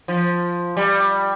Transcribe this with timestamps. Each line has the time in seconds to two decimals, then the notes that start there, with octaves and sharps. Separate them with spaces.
0.08 F3
0.77 G3